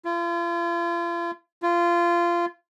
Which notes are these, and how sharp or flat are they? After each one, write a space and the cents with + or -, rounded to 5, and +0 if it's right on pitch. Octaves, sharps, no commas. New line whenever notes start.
F4 -40
F4 -20